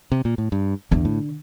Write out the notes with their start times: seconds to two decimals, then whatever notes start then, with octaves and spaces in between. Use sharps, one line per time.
0.12 C3
0.25 A#2
0.38 A2
0.52 G2
0.91 E2 D3
1.05 A2